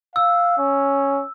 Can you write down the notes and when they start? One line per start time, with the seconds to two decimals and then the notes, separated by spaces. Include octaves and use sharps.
0.16 F5 E6
0.58 C#4